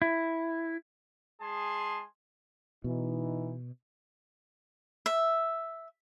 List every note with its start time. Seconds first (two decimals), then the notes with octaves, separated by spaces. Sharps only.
0.02 E4
1.42 G#3 G#4 G#5 A5 C6
2.84 B2 E3 D#4
5.06 E5